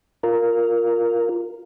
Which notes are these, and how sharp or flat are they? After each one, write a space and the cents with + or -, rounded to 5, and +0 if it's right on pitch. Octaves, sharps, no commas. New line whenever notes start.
F4 +0 A#4 +0